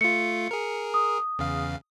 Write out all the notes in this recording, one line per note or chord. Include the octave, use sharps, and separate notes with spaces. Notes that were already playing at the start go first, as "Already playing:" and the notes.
A3 F4 C#7
G#4 A#4
D#6
E2 C#3 F5